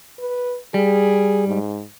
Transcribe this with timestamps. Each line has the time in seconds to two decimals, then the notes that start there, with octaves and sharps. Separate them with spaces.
0.19 B4
0.74 G3 G#4
1.47 G#2